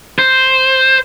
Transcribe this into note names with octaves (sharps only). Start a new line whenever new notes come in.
C5